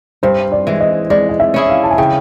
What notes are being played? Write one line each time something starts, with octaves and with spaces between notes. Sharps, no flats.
G2 C5
D5
E3 G#3
D#5
G#3 D5
D#5
E5
C#4 E4 G#4
F5
A5
G#5
C#3 G5